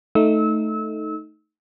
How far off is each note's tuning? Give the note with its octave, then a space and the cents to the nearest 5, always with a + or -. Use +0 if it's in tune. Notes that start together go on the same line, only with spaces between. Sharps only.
A3 +0 D#4 +5 E6 -30